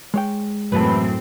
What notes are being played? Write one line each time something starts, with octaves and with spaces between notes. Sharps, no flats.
G#3 C#5 G5
F#2 A2 E3 A3 C4 B4 A5